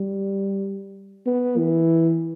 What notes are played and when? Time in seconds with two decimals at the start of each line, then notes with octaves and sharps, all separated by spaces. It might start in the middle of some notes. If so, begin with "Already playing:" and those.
Already playing: G3
1.26 B3
1.57 E3